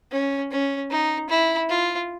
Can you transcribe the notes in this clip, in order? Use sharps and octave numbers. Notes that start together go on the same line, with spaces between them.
C#4
C#4
D#4
E4
F4